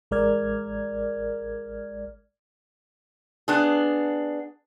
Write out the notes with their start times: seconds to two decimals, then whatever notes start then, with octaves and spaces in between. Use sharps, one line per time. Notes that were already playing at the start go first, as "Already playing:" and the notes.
0.11 A1 G#3 A#4 D5 F6 G#6
3.48 B3 D4 G#4